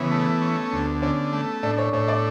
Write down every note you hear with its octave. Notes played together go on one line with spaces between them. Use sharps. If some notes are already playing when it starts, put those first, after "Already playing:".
Already playing: C#3 E3 B3
A3
C#4
D2
D3 C#4
A3
A2 D4
C#5
A2 C#5
D5